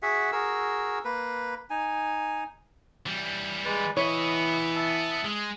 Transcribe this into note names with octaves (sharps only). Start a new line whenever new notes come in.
F#4 G#4 E5 F#5
F#4 G#4 A#4 E6
A#3 B4
D#4 G#5
E3 G3
G#3 B4 D5
E3 B3 E4 C#5 D#5
E5 A5
G#3